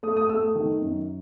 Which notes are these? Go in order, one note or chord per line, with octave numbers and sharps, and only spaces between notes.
A3 D#6
D#6
A3 E6
D#6
D#3
F#2